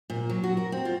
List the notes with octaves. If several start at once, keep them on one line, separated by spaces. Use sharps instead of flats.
A#2
F#3
F#4
A#4
C4
F4